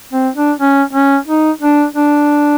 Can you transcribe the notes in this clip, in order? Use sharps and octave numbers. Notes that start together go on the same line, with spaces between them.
C4
D4
C#4
C#4
D#4
D4
D4